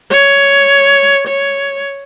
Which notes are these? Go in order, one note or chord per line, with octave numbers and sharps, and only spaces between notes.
C#5
C#5